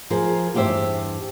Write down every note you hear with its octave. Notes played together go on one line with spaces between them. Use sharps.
F3 G#4 A#4 C5
E2 G2 G4 C5 E5